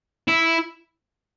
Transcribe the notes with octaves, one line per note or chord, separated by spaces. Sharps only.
E4